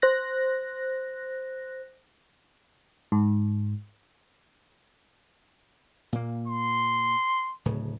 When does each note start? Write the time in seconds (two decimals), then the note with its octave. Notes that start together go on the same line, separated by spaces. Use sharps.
0.02 C5 F#6 A#6
3.12 G#2
6.13 A#2 A#3
6.48 C6
7.65 D1 A2 C#3